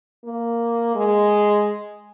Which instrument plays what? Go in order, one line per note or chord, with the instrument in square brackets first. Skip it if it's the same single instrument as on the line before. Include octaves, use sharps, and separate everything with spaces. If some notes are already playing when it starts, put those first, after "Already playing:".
[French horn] A#3
G#3